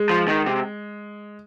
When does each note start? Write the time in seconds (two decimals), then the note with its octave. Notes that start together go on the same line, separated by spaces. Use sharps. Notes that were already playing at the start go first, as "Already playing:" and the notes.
Already playing: G#3
0.10 F3
0.28 D#3
0.46 C3